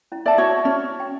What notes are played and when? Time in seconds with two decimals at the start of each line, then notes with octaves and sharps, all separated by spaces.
0.12 C#4 E4
0.26 D5 E5 A5 E6
0.38 F#4 C#5
0.65 C#4
1.00 G5